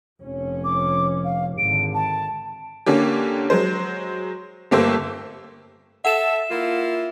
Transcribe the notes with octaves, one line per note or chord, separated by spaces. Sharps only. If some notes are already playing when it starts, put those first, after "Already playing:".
F1 C#4
D6
F5
G#1 D3 D7
A5
D3 A#3 C#4 G4
F#3 G#3 C5
G1 A3 A#3 G4 C5 E6
A4 E5 F#5 E7
A#3 E4 F4